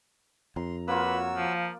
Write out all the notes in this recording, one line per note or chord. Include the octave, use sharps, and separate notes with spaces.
F2 A#5 C6
A#3 F4 F#4 B4 C#5 E6
F3